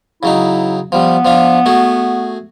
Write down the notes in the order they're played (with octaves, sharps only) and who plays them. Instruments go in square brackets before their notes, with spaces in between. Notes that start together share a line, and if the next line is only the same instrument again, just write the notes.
[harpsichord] C#3 F#3 D#4 [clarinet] E4
[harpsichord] F3 G3 [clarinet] B3
[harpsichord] F3 D4 F5
A3 F#4 G#4